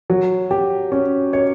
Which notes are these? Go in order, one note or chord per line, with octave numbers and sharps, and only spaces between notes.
F#3
G4
C#4
C#5